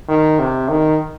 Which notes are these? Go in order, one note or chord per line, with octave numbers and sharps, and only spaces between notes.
D#3
C3
D#3